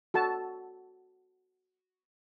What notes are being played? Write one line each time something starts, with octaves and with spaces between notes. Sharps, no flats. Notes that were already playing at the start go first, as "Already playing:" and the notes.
F#4 A4 A5